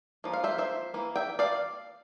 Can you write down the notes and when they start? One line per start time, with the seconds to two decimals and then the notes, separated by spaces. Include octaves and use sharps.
0.24 F3 A#3
0.33 F5
0.44 C5 E5
0.58 C5 E5
0.94 E3 A#3
1.16 E5 G5
1.39 D5 F5